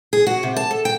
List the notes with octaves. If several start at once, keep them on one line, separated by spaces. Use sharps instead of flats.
G#4
F#4
C3
A5
A4
G5